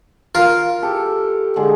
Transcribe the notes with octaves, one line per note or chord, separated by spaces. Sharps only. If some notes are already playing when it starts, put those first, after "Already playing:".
F4 A#4
G4 A4
D3 G#3